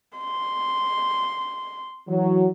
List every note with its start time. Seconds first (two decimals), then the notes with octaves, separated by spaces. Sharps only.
0.17 C6
2.09 E3 F#3